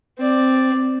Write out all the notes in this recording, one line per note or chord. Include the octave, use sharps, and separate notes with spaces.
C4 D5